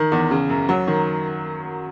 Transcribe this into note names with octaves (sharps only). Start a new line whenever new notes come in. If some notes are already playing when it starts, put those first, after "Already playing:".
Already playing: D#3
E2
C#3
F#2
F#3
D#3